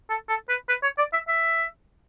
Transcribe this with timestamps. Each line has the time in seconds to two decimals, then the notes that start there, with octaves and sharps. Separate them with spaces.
0.10 A4
0.29 A4
0.49 B4
0.69 B4
0.83 C#5
0.98 D5
1.14 E5
1.28 E5